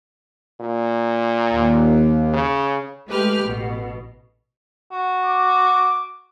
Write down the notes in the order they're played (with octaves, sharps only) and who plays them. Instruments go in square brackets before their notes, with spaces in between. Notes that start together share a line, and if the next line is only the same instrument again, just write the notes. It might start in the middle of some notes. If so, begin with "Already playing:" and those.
[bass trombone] A#2
[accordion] D#2
[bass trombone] C#3
[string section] G#3 A3 G4 B4 B5 F6
A1 B2
[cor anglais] F#4
[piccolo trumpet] D6